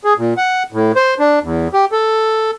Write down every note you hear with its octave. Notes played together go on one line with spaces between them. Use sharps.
G#4
A#2
F#5
A2
C5
D4
E2
G4
A4